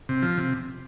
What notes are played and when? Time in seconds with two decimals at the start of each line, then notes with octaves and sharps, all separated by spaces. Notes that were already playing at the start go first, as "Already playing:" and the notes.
0.09 C3
0.22 F3
0.37 C3